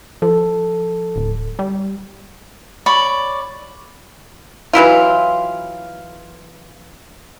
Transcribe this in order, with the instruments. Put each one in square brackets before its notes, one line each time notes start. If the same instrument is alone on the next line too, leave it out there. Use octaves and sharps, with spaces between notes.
[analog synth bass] F3 [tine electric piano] A4
[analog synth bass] D1
G3
[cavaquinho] C#5 D5 B5
[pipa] E3 F#3 E4 F4